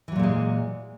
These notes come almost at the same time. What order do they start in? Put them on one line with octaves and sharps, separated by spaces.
E3 F#3 A#2 A3 G#3